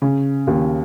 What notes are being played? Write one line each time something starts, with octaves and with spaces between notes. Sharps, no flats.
C#3
D#2